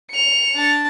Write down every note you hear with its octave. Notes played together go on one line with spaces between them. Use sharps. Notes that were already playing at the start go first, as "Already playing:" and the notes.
C#7 F7
D4 A5